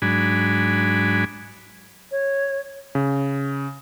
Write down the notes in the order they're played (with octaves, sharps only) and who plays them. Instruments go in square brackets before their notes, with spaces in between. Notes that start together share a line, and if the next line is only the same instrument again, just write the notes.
[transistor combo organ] G#2 F#3 D4 G#5 B5
[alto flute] C#5
[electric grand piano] C#3